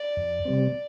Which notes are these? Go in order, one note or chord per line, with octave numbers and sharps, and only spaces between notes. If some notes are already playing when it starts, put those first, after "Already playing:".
Already playing: D5
F2
C3 G3 C4